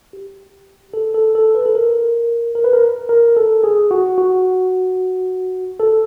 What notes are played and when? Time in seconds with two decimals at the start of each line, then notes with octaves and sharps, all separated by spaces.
0.13 G4
0.94 A4
1.15 A4
1.35 A4
1.55 B4
1.66 A4
1.75 A#4
2.55 A#4
2.64 B4
2.73 A#4
3.09 A#4
3.37 A4
3.64 G#4
3.91 F#4
4.18 F#4
5.80 A4